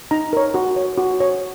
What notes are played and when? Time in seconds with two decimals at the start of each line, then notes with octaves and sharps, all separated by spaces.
0.11 D#4 A#5
0.33 A#4 C#5
0.54 F#4
0.76 C#5
0.98 F#4
1.20 C#5